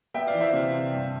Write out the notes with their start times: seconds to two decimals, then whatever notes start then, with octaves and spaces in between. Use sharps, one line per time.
0.14 B3 E5 G5
0.27 D5 F5
0.34 E3
0.40 C5 E5
0.53 C3
0.72 C3
0.93 G2